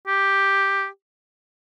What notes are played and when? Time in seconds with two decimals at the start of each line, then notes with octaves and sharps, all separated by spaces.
0.07 G4